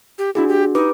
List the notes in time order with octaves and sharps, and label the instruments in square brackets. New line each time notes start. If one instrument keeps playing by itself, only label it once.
[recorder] G4
[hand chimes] D4 F#4 G#4 [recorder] E4
[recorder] G4
[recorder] D#4 [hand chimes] G4 B4 D6